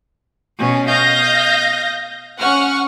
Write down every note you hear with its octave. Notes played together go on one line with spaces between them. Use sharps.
B2 C#4
D#5 F5 G6 A#6
C#4 F#5 C#6 F6